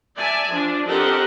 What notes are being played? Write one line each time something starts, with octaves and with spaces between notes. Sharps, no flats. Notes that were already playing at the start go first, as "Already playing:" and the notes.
D5 E5 G#5 A5
F3 D4
C4 G4 A4 A#4 D#5 F#5